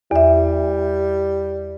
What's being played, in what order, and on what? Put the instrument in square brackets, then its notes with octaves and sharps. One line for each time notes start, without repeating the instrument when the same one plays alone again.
[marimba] E2 E5 [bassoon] G3